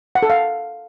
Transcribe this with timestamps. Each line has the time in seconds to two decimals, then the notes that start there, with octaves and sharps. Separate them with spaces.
0.15 F#5
0.23 A4
0.30 F5